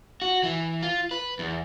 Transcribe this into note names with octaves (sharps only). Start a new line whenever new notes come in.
F#4
E3
F4
B4
E2